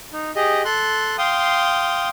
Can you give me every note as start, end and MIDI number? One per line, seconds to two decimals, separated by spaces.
0.13 0.31 63
0.36 0.62 67
0.36 0.62 68
0.36 0.62 75
0.65 1.16 69
0.65 1.16 84
0.65 1.16 90
1.18 2.09 77
1.18 2.09 79
1.18 2.09 84
1.18 2.09 87